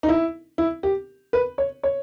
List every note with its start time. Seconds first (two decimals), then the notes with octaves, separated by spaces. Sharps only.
0.03 D#4
0.09 E4
0.58 E4
0.83 G4
1.33 B4
1.58 C#5
1.83 C#5